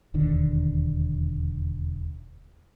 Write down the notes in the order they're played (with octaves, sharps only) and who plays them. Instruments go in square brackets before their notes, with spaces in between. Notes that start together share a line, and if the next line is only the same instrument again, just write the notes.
[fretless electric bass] E1 D#2 D3 D#3